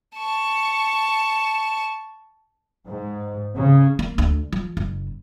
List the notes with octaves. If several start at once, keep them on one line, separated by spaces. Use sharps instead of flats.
A5 C#6
G#2
C#3
A#3
D2
F3
F#1